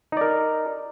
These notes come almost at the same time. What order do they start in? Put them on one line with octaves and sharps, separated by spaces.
D#4 D5 A#4